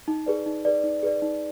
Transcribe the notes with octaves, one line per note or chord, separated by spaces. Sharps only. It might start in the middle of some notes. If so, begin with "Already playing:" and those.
D#4
G#4 B4 D5
D#4
G#4 B4 D5
D#4
G#4 B4 D5
D#4